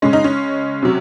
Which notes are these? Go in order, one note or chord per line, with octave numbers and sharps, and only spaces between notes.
C#3 G#3 C#4
D#4
C#4
C3 F#3